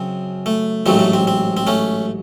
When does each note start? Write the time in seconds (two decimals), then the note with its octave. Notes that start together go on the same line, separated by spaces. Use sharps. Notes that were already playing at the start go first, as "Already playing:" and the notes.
Already playing: F#2 C#3 F#3 C4
0.46 A3
0.86 A1 G#2 F#3 A3 C4
0.99 A3
1.13 C4
1.27 C4
1.57 C4
1.67 A3 C#4